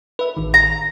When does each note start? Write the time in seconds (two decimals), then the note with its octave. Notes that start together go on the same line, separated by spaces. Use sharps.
0.19 B4 E5
0.37 A1 D#3
0.54 A#5